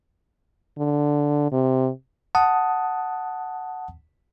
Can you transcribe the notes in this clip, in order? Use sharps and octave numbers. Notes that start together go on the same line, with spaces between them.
D3
C3
F#5 A5 D#6